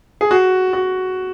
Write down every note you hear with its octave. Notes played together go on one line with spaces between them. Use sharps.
G#4
F#4
F#4